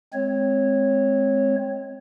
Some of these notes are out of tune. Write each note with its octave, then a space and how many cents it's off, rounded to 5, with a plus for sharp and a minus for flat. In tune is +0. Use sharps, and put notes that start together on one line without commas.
G#3 +10 C4 +0 C#5 -10